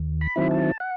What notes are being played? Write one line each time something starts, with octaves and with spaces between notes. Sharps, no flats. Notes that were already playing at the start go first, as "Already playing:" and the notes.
Already playing: D#2
B5
D#3 F#3 C4 E4
A5
F#5